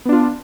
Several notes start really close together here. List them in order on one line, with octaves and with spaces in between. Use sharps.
B3 D4 F4